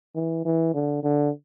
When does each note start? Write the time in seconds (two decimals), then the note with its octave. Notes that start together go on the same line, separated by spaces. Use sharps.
0.15 E3
0.45 E3
0.74 D3
1.03 D3